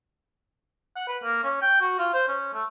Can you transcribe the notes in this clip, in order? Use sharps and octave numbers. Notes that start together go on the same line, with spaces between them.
F#5
B4
A#3
C#4
G5
F#4
F4
C5
C#4
A3